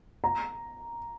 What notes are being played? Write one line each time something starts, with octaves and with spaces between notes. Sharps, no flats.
A#5